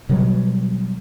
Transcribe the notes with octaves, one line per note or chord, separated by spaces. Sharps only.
B2 D#3 F#3 G3